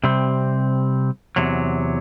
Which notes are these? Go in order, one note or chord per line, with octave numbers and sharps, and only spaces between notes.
C3 G3 C4
E2 C3 F#3